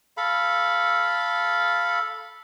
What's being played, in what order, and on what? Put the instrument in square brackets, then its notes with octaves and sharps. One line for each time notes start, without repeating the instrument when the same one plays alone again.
[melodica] A4 F5 B5